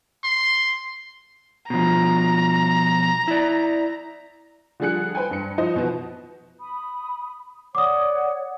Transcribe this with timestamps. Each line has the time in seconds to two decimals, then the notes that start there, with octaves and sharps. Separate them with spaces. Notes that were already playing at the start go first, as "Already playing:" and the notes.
0.24 C6
1.70 B2 F3 A#5
3.28 E4 D5
4.80 D3 F3 G3 G#4 F#6 C#7
5.15 B4 C5 G5 G#5
5.31 G2 C#7
5.58 F3 D#4 C5 D#5
5.76 B2 F3 B3
6.60 B5 D#6
7.75 C#5 D5 F#5 D6 D#6